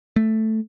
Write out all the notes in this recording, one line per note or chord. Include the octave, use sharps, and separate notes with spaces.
A3